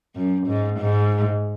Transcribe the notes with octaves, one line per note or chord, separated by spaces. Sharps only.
F#2
G#2
G#2